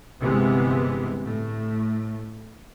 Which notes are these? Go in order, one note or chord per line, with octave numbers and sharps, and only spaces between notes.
G1 C3 E3 G#3 B3
A2 A3